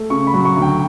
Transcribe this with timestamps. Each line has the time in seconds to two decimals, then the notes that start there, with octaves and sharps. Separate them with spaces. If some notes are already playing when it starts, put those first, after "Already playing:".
Already playing: A3
0.10 C#3 C#6
0.27 B5
0.34 F#3
0.45 C#6
0.56 D2
0.62 G5